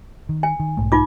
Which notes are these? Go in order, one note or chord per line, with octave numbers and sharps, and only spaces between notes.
D#3
G#5
D#3
B1 G#2 A3
D#4 F4 D6